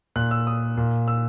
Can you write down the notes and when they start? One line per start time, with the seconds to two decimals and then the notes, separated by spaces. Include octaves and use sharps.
0.16 A#2 F#6
0.31 E6
0.47 D#6
0.77 A#2
1.08 E6